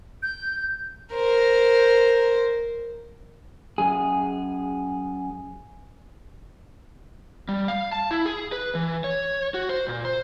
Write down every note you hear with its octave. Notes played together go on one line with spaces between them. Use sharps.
G6
A#4 C5
F#2 G#4
G3
F5
A5
E4
G#4
B4
E3
C#5
F#4
C5
A#2
C5